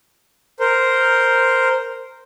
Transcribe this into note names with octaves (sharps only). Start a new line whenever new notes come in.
A#4 C5